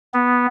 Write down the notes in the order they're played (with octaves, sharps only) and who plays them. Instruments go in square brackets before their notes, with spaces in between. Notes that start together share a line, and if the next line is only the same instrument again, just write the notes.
[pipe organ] B3